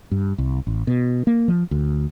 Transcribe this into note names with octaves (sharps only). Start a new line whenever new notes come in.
G2
C2
A1
B2
A#3
F3
D2